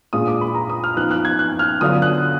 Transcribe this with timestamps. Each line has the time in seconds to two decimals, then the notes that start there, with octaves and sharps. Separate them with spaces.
0.13 A#2 G#3 D4 F4 D#6
0.28 D6
0.41 B5
0.55 A#5
0.70 D#6
0.84 F6
0.97 F3 B3 D#4 F#6
1.11 F#6
1.25 G#6
1.39 F#6
1.59 F6
1.81 D3 F#3 B3 D4 F4 D#6
2.02 F#6